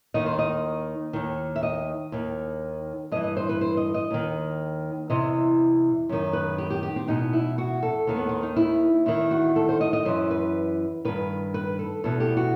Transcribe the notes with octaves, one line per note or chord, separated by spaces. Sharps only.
D#2 D#3 D#5
C5
D#5
D#2 D#3
E5
D#5
D#2 D#3
G2 E3 D#5
D#5
C5
B4
C5
D#5
D#5
D#2 D#3
E2 C3 E3 D#5
F#2 D#3
B4
G4
G4
G4
C4
E2 B2 D#4
E4
F#4
A4
D#2 D#3
B3
C4
D#4
E4
E2 D#3 E4
F#4
A4
C5
D#5
D#5
F#2 E3 C5
B4
G2 D#3 B4
B4
A4
E2 B2 A4
G4
F#4